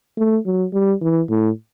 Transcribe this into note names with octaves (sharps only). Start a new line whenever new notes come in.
A3
F#3
G3
E3
A2